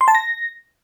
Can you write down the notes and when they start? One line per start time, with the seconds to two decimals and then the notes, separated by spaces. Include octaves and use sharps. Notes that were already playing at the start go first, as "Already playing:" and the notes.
0.01 C6
0.08 A5
0.15 A#6